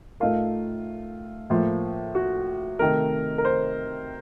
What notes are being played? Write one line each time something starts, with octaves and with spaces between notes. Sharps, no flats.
A2 A3 D#4 F4 A#4
A2 F3 A#3
F#4
C3 D#3 A3 A#4
A#4
C5